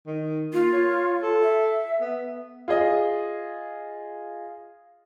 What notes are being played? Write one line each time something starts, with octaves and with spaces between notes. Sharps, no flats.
D#3
A#3 F4
C#5
A4
E5
B3
F4 G#4 D#5